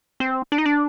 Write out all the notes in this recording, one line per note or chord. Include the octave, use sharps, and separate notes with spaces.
C4
D4
D#4
D4